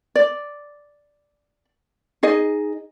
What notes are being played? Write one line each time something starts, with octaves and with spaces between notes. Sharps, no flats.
D5
D#4 G#4 D#5